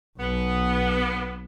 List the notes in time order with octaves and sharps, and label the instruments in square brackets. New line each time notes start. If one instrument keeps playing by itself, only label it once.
[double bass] B1 [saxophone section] B3